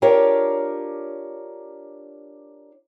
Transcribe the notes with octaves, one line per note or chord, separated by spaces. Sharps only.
D4 F4 G4 A#4 C#5